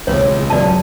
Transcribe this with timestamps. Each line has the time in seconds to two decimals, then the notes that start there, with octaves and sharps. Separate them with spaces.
0.07 C#2 C#5
0.50 F#2 F#3 D5 A5